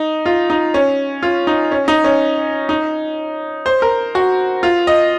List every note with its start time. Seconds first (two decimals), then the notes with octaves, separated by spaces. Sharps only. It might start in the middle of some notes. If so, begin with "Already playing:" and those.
Already playing: D#4
0.26 F4
0.50 D#4
0.74 C#4
1.23 F4
1.47 D#4
1.71 C#4
1.88 D#4
2.04 C#4
2.69 D#4
3.66 C5
3.82 A#4
4.15 F#4
4.63 F4
4.87 D#5